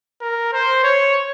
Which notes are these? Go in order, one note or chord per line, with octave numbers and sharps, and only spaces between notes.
A#4
C5
C#5